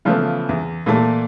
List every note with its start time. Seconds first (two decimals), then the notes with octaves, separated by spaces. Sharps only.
0.05 C#3 E3 F3 A3 B3
0.49 E2
0.86 A#2 E3 A3 A5